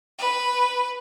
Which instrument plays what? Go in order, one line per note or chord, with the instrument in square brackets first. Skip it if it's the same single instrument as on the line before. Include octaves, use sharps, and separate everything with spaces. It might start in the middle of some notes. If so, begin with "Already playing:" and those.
[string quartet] B4